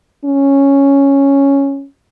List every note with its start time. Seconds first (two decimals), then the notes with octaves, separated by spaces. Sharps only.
0.25 C#4